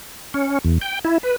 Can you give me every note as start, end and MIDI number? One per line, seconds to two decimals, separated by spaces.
0.34 0.59 61
0.65 0.79 40
0.82 0.99 79
1.04 1.18 64
1.23 1.36 71